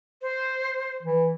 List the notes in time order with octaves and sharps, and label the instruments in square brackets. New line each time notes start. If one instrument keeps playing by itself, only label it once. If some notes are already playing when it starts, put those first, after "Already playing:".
[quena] C5
[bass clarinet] E3